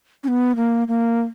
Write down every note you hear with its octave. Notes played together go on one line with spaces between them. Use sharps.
C#4
B3
A#3
A#3